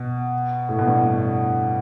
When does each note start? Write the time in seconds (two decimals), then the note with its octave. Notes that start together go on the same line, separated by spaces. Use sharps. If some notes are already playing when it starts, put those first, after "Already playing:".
Already playing: B2
0.69 A2
0.79 B2
0.87 G2